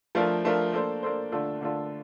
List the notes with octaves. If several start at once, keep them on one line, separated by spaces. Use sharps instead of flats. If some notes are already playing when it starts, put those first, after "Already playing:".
F3 A3 D4 F4 A#4
F3 A3 D4 F4 A#4
A#3 D4 A4 C5
A#3 D4 A4 C5
D3 A3 D4 F4 A4
D3 A3 D4 F4 A4